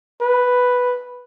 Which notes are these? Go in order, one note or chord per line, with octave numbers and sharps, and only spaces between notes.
B4